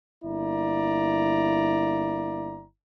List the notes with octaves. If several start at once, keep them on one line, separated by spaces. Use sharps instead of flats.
G1 A#3 E4 D5 A#5